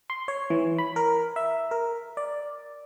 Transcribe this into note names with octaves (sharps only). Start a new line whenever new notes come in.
C6
C#5
E3
B5
A#4
E5
A#4
D5